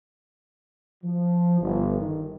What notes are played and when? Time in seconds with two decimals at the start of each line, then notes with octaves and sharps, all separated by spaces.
1.04 F3
1.61 G1
2.00 D#3